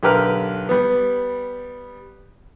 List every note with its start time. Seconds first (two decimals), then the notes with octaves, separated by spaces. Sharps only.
0.03 B1 D3 G4 A#4 B4 F6
0.69 G3 B3